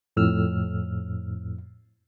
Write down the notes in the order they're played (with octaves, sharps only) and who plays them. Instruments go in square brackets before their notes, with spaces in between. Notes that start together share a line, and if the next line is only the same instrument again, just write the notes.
[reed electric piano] F2 A2 E6 F6